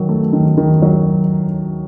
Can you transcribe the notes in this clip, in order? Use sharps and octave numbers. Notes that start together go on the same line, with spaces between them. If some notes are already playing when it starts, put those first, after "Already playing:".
Already playing: D#3 F#3
A3
D#3
D#3
F#3